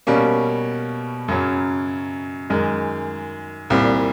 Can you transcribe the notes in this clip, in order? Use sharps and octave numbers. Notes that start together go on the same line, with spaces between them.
B2 G3 A#3 C#4
F#2 C#3 F#3
F#2 D#3 G#3
C2 A#2 G3 C4